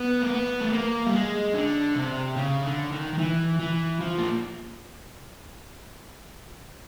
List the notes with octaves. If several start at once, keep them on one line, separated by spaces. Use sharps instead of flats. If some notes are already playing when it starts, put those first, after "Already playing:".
Already playing: B3
A#3
B3
A3
A#3
G3
G#3
D3
C3
C#3
D3
D#3
D#3
E3
E3
F3
A#3